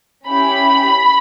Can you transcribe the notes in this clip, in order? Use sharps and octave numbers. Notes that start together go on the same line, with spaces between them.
C#4 E4 G4 B5